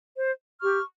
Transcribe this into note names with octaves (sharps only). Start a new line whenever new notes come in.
C5
G4 C#6 F6